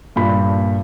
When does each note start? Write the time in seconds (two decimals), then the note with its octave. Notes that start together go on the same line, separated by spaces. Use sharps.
0.16 G2 A#2 B5